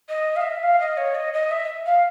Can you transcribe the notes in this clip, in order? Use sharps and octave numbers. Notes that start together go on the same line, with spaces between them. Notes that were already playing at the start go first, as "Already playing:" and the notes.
D#5
F5
E5
F5
D#5
C#5
D#5
D#5
E5
F5